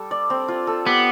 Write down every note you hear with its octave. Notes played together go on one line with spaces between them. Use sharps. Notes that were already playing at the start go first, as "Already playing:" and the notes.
Already playing: G3 D4 A4
D5
C4
F4
A4
B3 G4